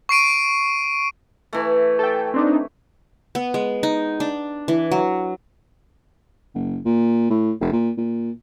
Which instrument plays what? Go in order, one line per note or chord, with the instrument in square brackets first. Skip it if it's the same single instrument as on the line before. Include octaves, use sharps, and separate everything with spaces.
[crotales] C#6 C7 D7 D#7
[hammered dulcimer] E3 A3
[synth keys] A4 G5
C4 D4 D#4
[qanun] B3
G#3
D#4
D4
E3
F#3
[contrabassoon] F#1
A#2
A2
F1
A#2
A#2